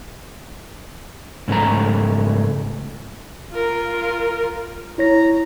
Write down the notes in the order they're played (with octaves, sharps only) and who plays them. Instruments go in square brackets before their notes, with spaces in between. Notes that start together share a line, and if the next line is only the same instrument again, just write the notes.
[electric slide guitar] G#2 C#3 A3 A#5
[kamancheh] F4 A#4
[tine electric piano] E4 C#5 A#6 [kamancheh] A#5